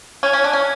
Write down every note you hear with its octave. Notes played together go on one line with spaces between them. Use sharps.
C#4 G#6
C#4
D4
C#4